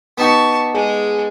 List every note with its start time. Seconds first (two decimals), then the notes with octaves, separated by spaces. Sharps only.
0.18 B3 D#4 G4 A5 C#6
0.75 G#3 G#4